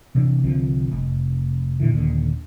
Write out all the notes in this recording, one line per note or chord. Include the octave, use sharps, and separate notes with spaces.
C3 E3 D4
C2 D3 F3 C4
F1
A#2 D3 E3
D#1 D#2 D3